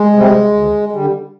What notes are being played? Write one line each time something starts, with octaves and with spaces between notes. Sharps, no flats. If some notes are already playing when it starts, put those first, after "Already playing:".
Already playing: G#3
C3 G3
D2
D3 G3